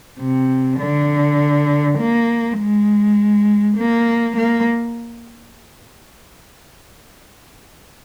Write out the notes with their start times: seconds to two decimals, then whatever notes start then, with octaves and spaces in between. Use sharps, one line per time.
0.19 C3
0.79 D3
1.98 A#3
2.58 G#3
3.77 A#3
4.37 A#3